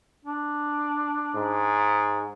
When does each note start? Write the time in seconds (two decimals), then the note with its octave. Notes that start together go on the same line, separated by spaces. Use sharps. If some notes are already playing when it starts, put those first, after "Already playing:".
0.25 D4
1.35 G#2